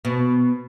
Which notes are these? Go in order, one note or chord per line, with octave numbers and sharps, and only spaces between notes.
B2